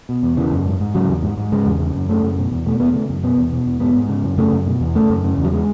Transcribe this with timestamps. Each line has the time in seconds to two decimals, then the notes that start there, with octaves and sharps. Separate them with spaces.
0.09 B2
0.23 E2
0.37 C#3 E3
0.52 F#2
0.66 G#2
0.80 G#2
0.94 C#3 F#3
1.09 E2
1.23 G#2
1.38 G#2
1.52 C#3 G#3
1.66 E2
1.80 C#3
1.95 F#2
2.09 C#3 A3
2.23 F#2
2.38 B2
2.52 E2
2.66 B2 A3
2.80 E2 B3
2.93 C#3 A3
3.09 F#2
3.24 B2 B3
3.38 E2
3.52 B2
3.66 E2
3.80 G#2 B3
3.95 G#2
4.09 C#3
4.23 F#2
4.38 C#3 A3
4.52 F#2
4.67 B2
4.81 E2
4.95 C#3 A3
5.10 F#2
5.24 C#3
5.38 E2
5.45 F#3
5.53 G#3